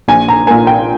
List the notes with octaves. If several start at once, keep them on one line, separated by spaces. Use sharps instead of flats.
A#1 G#5
A#5
A#2 A#3 G#5
G5